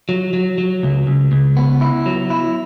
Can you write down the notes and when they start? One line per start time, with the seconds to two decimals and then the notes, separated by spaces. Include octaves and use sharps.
0.09 F#3
0.33 F#3
0.58 F#3
0.83 C#2
1.07 C#2
1.32 C#2
1.57 B3
1.81 E4
2.06 F#3
2.30 E4